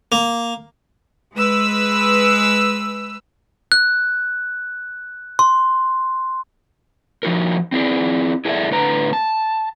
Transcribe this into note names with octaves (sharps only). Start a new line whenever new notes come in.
A#3
G#3 B4 E6
F#6
C6
F3 D#4 F#4 A#4
C4 E4 G#4 D5
E4 G#4 A4 C#5 D5 E5
A2 D3 B4 A#5
A5